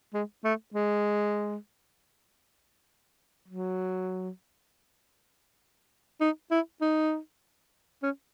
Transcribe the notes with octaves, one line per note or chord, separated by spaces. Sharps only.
G#3
A3
G#3
F#3
D#4
E4
D#4
C#4